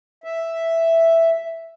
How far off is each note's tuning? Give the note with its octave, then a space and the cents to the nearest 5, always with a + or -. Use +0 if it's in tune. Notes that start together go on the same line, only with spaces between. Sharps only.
E5 +0